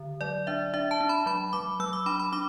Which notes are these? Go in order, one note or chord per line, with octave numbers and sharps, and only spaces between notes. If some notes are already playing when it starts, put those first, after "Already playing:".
Already playing: D3
F#3 D5
D4 E5
D4 E5
A5
D4
B5
F#3 B5
F#3 D6
F#3 E6
D6
D4 B5
B5
D4 D6